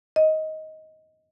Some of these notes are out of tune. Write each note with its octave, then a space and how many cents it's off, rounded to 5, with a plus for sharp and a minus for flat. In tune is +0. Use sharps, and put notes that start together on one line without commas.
D#5 +15